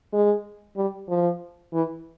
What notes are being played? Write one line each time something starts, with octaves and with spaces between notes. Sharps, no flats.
G#3
G3
F3
E3